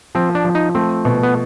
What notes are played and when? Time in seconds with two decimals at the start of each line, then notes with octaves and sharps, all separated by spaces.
0.15 F3 C4
0.35 D4
0.44 F3
0.55 D#4
0.75 A3 C4
1.05 B2
1.23 B3